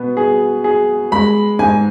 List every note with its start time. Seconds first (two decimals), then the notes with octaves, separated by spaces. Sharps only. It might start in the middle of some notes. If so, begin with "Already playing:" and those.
Already playing: B2 B3
0.17 G#4
0.64 G#4
1.12 G#3 B5
1.59 G#2 G#5